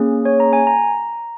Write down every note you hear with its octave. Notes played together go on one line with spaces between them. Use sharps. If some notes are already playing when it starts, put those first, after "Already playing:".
Already playing: A#3 C#4 G#4
C#5
A#5
G#5
A#5